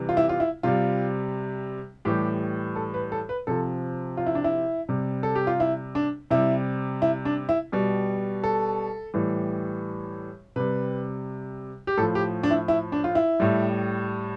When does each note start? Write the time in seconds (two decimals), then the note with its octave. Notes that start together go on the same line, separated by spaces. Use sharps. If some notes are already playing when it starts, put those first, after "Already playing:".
Already playing: C3 E3 G3
0.09 F4
0.17 E4
0.29 F4
0.40 E4
0.63 C3 G3 F4
2.05 A2 E3 G3 G4
2.76 A4
2.94 B4
3.12 A4
3.29 B4
3.47 C3 F3 A4
4.17 F4
4.26 E4
4.35 D4
4.44 E4
4.89 C3 G3
5.23 A4
5.35 G4
5.47 F4
5.60 E4
5.95 D4
6.31 C3 G3 E4
7.02 E4
7.25 D4
7.49 E4
7.72 B2 G3
8.44 A4
9.14 A2 E3 G3
10.56 C3 G3 B4
11.87 G4
11.98 A2 F3 A4
12.15 G4
12.43 D4
12.51 E4
12.68 E4
12.92 D4
13.04 F4
13.15 E4
13.40 A2 G3